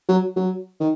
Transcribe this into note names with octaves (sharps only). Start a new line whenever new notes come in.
F#3
F#3
D#3